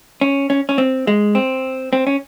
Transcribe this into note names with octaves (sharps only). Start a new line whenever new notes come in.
C#4
C#4
C#4
C4
G#3
C4
C4
C#4